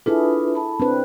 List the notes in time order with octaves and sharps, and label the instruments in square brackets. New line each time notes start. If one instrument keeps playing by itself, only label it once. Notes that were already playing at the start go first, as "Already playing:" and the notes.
[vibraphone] D4 F4 B4 [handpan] E4 G#4 A4
[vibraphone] A5 B5
[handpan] C4 D4 B4